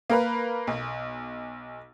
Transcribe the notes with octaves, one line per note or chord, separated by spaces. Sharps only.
A#3 A#4 B4
B1